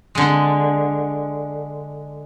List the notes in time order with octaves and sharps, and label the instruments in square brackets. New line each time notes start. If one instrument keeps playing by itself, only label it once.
[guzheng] D3 G#3